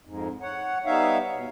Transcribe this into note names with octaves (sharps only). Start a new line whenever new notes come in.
F2 G#2
C#5 F#5
G3 B3 D#4 C#5 E5 F5
B2